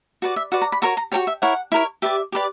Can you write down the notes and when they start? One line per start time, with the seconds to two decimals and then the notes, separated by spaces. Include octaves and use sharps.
0.22 F#4 B4 D5
0.36 E5
0.52 F#4 B4 D5 F#5
0.61 A#5
0.72 B5
0.82 F#4 A#4 C#5 C#6
0.97 A#5
1.12 F#4 A#4 C#5 G5
1.27 E5
1.42 E4 A#4 C#5 F#5
1.72 E4 A#4 C#5
2.02 G4 B4 D5 E5
2.32 G4 B4 D5